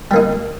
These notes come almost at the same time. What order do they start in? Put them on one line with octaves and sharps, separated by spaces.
G3 A#3 D#4